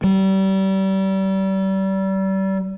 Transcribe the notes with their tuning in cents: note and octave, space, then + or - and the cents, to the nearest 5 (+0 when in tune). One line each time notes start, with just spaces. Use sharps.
G3 -30